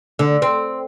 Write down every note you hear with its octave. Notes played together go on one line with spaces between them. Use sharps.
D3
C4